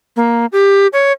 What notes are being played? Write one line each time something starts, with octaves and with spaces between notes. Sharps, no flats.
A#3
G4
C#5